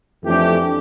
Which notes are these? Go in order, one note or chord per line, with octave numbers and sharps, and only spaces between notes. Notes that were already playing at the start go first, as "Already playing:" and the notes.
F2 E3 A3 D4 G4